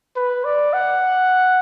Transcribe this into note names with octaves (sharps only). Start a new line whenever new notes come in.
B4
D5
F#5